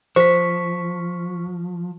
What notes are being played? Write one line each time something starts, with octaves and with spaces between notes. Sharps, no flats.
F3 C5 C#6 B6